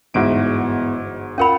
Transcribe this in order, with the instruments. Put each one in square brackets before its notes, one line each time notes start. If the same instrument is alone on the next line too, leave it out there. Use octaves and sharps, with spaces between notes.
[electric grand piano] G1 G#2 F#4 [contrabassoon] E2 [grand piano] E5 D7
[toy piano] C#4 A#4 B5 [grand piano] F4 F#5